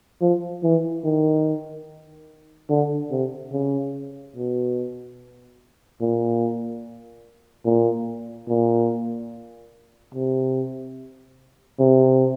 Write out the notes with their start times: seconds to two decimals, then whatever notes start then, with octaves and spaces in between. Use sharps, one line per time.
0.21 F3
0.63 E3
1.04 D#3
2.69 D3
3.11 C3
3.52 C#3
4.36 B2
6.01 A#2
7.65 A#2
8.48 A#2
10.14 C3
11.79 C3